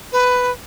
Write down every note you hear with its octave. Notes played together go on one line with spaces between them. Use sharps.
B4